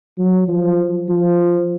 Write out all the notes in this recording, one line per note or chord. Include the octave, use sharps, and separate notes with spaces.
F#3
F3
F3